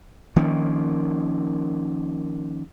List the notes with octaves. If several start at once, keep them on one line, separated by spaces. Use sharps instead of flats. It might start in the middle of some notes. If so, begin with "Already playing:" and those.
D#3 F3 A#3 C#4